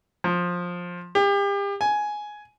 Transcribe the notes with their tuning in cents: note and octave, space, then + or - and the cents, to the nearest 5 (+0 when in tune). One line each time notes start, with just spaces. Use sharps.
F3 +15
G4 +35
G#5 +10